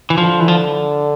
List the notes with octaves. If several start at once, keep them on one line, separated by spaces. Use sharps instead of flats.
E3
D3 F3
E3
F3